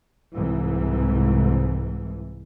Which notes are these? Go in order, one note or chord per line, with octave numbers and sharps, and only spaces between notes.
C2 G#2 E3